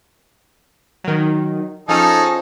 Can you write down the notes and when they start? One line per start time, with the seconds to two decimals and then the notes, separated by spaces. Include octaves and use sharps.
1.04 D#3 F#3
1.89 F3 C#4 D#4 G#4 A4